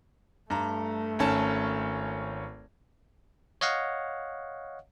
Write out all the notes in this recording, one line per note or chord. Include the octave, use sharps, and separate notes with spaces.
G2 A3 A#5
G#1 C#4 A5
C#5 D#5 F5 F#5